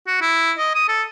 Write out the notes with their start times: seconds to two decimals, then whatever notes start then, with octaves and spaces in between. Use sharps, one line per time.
0.07 F#4
0.22 E4
0.58 D#5
0.75 D#6
0.89 A4